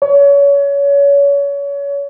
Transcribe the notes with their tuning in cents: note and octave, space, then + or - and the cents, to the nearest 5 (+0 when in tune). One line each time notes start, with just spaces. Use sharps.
C#5 +30